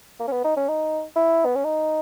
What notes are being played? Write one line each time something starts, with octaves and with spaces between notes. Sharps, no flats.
A#3
C#4
B3
D#4
C#4
D#4
E4
B3
C#4
D#4